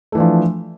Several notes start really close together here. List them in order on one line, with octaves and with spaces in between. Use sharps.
A3 E3 D4 F3